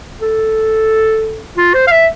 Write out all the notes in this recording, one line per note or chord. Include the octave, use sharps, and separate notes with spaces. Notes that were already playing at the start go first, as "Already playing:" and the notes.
A4
F4
C5
F5
E5